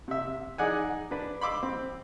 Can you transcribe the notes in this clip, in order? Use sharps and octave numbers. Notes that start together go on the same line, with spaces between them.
C3 E5
D#4 G#4 D5 F#5 G#5
D4 B4
B5 C6 D6 E6
C4